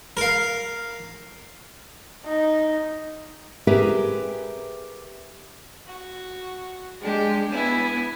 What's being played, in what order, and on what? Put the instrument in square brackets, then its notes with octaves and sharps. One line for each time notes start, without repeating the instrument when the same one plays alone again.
[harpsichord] A#4 F5
[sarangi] D#4
[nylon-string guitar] G4 G#4 A#4 B4 E5
[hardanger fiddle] F#4
[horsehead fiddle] G#3 [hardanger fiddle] D4 G4
[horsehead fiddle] B3 [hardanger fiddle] E4 G#5